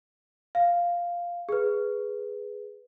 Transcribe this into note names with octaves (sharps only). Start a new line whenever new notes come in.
F5
G#4 B4